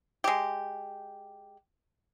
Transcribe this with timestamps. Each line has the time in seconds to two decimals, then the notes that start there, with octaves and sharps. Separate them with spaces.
0.24 G#3 G4